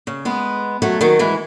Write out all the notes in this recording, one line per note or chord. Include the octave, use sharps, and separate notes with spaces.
C#3
G#3 B3
F#3 A3
D#3 F#3
E3 G#3